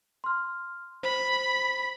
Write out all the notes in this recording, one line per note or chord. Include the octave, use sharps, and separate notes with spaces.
C6 F6
C5 B5